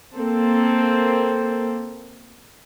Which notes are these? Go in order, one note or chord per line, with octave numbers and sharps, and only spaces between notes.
A#3 C4 A4